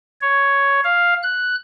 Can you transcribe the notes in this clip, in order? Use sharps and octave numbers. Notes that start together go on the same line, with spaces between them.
C#5
F5
F#6